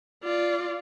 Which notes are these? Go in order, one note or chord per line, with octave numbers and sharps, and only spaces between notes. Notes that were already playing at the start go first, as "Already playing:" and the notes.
F4 D5